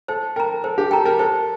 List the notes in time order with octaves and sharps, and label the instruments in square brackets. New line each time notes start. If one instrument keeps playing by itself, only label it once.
[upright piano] A4 [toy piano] C5
[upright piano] A#4 [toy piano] G5 A#5
[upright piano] A4 [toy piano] C5
[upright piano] G4
[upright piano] A4 [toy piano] G5 A#5
[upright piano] A#4
[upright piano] A4 [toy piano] C5